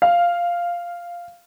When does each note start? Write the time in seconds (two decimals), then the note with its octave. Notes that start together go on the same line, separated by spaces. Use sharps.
0.02 F5